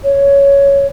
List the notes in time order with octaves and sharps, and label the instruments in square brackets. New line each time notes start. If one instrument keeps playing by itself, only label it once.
[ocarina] C#5